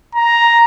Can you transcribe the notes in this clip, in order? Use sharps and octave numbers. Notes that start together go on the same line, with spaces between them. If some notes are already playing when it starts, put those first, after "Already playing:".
A#5